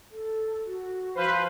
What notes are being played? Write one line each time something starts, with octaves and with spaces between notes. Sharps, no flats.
A4
F#4
F3 F4 B4 C5